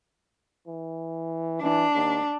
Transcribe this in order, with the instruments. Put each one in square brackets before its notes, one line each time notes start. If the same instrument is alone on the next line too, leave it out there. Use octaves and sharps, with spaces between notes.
[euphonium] E3
[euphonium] E3 [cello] D4
[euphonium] D#2